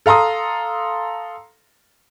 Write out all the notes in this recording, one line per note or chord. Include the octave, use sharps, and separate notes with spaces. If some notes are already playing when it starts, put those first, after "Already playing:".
A4 F5 A#5 C6 D#6